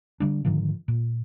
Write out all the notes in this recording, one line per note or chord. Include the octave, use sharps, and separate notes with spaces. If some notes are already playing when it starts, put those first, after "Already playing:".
D3 G3 D4
G#2 D3 D#3 F3
A#2